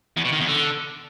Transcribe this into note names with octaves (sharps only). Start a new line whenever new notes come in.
E2
B2
D#3
E2
D3